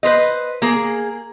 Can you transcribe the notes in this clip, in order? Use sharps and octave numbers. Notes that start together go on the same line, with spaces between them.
B4 C5 D#5
A#3 G#4